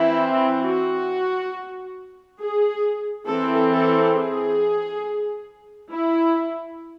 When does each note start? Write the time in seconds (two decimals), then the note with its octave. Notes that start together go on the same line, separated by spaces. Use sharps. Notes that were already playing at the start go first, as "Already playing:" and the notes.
Already playing: E3 C4 E4
0.63 F#4
2.39 G#4
3.27 E3 C4 A4
3.72 A4
4.15 G#4
5.91 E4